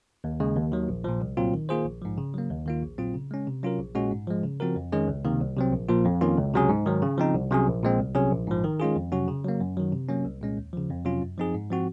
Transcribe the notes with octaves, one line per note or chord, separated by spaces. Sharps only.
D#2
C#3 G#3
D#2
D#3 F#3
A#1
A#2 F3
C2
A#2 F#3 C4 F4
D#3
A#3 F4 G#4 C5
A#1
G#2 F3
C#3
F#3 A#3
D#2
D#3 A#3 F4
A#1
A#2 F#3 C4 F4
C#3
G#3 C#4
C3
F#3 C#4 F4 A#4
A#1
A#2 G#3 C#4 F#4
G#2
F3 G#3
C#3
F3 C4 F#4 A#4
F2
D#3 G#3 C#4 G#4
C#2
C3 D#3 A#3
C2
C3 F#3 C4
A#1
A#2 F3 A#3 F4
F2
D#3 A#3 C#4 F4
C#2
C3 F#3 C#4 G#4
G#2
D#3 F#3
C#3
F3 C4 D#4
C2
C3 F#3 C#4 G#4
A#1
A#2 G#3 C4
C2
C3 F#3 C#4 G#4
A#1
G#2 F3
D#3
G#3 C#4 F4 G#4
F2
C3 F#3 C#4 F#4
C#3
F#3 A#3
F#2
D#3 F#3
C3
F#3 A#3 C#4
C2
A#2 G#3 C#4
D#2
C#3 F3
F2
C3 F#3 C#4 F4
F#2
F3 C4 D#4 G#4
G#2
F3 C4 F#4